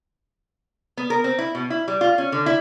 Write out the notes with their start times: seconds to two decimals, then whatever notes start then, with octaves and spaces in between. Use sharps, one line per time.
0.97 B3
1.10 A#4
1.24 C4
1.38 E4
1.55 B2
1.70 E4
1.88 G3
2.01 F4
2.18 C#4
2.32 D3
2.46 E4